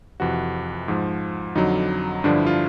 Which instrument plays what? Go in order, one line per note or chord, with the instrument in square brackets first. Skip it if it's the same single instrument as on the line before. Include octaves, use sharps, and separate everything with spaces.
[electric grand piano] F2 C3 E3 F#4
G#2 F3
F2 D3 F#3 D#4
G2 D3 F3 D4
E4
F4